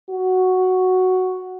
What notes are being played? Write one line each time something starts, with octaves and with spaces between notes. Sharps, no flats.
F#4